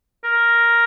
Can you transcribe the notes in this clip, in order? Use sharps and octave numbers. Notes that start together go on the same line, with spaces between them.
A#4